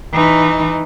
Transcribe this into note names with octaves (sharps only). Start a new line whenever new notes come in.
E3 D#4